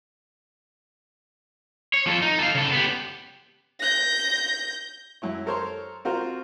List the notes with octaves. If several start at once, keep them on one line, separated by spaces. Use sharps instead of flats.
C#5
F3 A4
D#4
A4 F5
C#3 A4
B3 G4
G6 A#6
F#2 E4 C#5
A4 A#4 C5 C#5 C6
C4 F4 F#4 A#4 C5